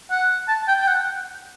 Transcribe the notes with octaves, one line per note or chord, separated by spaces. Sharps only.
F#5
A5
G5
G5
F#5